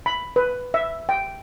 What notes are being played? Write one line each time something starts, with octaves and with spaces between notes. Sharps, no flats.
B5
B4
E5
G5